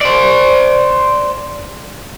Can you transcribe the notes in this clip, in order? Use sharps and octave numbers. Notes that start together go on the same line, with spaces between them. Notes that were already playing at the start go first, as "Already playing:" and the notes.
C5 D5